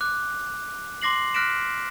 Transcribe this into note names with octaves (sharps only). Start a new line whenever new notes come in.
D6 F#6
C6 D6 A#6 C7 F#7
F6 F#6 A#6 B6 D7 E7